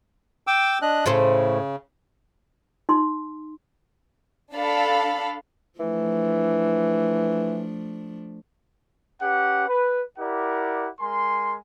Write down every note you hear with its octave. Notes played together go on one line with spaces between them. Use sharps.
G5 D6 E6
D4 D#5 F#6
A2 C#3 A4 C5
D#4 C6
D4 A4 F5 B5
E3 F3 A3 D4
C#4 G4 B4 F#5
B4
E4 G4 A#4 D5 F#5
G#3 A#4 G#5 C6